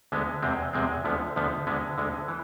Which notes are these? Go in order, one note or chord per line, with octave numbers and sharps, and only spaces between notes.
D2 D3 G#3 B3
E2 C3 G#3 C4
E2 C3 G#3 C4
D2 D3 F3 B3
D2 D3 F3 B3
D2 D3 G#3 B3
D2 D3 G#3 B3
E3